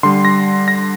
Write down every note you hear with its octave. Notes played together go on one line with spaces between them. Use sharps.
D3 G3 C6
A#6
A#6